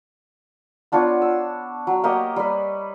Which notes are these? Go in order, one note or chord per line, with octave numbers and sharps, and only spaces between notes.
B3 D4 F4 C#5
E6
F#3
A#3 G4 C#5 D#5
G3 B4